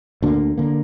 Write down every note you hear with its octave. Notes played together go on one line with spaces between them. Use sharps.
D2 D3 A#3
D3 A#3